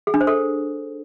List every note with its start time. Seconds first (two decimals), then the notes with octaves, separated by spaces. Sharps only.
0.07 G#4
0.14 D4
0.21 C5
0.27 A4